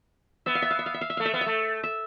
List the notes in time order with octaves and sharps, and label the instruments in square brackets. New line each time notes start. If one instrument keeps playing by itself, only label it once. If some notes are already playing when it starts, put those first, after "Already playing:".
[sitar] B3 [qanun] E5
[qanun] F5
E5
F5
E5
F5
E5
F5
E5
[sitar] A3 [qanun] F5
[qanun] E5
[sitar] B3 [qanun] F5
[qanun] E5
[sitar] A3
[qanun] E5